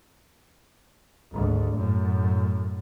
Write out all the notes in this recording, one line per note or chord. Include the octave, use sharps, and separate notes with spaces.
G#1 D2
F#2 A2